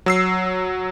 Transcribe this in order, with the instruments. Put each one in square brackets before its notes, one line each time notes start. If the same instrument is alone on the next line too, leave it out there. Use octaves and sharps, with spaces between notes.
[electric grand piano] F#3 E6 C7